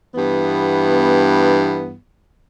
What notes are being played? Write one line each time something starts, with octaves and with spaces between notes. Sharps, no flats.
G2 E3 B3